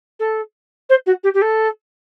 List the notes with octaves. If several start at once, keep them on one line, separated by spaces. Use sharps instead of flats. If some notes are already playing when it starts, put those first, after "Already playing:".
A4
C5
F#4
G4
G4
A4